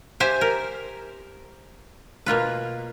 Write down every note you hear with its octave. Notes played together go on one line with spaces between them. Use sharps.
G4 C5 E5 G#5
A#4
B2 A#3 F4 B4